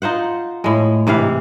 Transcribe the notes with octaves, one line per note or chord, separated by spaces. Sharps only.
D#4 F4 C5 F#5
A2 G#3
G#2 C3 E3 F5